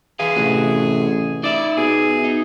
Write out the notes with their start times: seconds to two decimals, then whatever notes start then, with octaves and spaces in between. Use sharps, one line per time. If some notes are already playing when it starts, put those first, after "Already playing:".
0.19 E3 G#4 B4 F5
0.36 A1 C3 F#4
1.43 D#4 D5 E5
1.77 B2 G#4
2.24 D#4